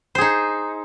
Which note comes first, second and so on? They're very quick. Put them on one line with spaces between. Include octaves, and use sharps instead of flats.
C5 G#4 D#4